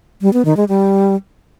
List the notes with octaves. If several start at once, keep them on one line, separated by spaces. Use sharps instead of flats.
G3
B3
D#3
G#3
G3